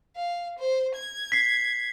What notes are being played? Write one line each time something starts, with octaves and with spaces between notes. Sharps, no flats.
F5
C5
G#6
B6 C7